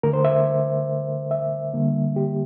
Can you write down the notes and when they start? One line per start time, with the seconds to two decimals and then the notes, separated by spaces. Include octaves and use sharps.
0.03 D3 A3 A#4
0.13 C5
0.25 E5
1.31 E5
1.74 D3 G3 A#3
2.16 G4